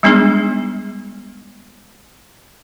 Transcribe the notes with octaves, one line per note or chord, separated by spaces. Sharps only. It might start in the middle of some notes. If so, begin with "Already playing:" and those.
G3 G#3 B3 D4 D#4 G#4